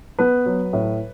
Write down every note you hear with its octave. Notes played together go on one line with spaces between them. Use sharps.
B3 B4
F#3
A2